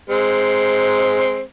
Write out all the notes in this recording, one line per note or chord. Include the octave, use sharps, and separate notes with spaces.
G#3 C4